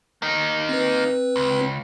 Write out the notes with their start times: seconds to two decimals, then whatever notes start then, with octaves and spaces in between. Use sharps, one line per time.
0.22 A#3 D#4
0.69 C4 B4
1.36 C#2